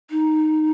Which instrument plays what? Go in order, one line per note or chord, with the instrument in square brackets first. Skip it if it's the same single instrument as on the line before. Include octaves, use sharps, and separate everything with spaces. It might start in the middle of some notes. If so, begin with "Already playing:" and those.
[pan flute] D#4